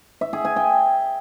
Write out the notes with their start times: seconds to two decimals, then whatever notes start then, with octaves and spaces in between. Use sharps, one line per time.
0.21 E5
0.33 G#4
0.45 G#5
0.56 G5